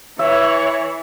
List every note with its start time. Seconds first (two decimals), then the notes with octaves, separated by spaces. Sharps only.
0.19 E3 C#5 E5